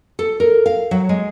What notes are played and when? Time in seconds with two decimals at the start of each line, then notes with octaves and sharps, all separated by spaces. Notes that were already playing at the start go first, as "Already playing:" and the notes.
0.19 A4
0.40 A#4
0.66 F5
0.91 F#3
1.09 G#3